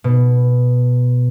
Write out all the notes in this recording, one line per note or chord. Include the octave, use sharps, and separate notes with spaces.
B2